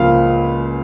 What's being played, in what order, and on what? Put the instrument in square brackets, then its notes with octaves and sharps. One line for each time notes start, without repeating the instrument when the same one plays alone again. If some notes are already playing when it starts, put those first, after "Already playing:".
Already playing: [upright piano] C#2 C#3 F3 A#3 F5